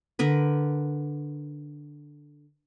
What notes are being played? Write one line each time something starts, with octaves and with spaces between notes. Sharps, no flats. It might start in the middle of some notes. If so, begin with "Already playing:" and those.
D3 A#4 B4